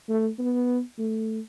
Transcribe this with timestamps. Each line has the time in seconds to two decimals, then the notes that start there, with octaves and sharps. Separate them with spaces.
0.09 A3
0.38 B3
0.98 A3